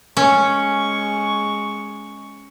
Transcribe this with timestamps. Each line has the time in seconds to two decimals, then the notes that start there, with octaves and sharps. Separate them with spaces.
0.17 G#3 C#4 C#6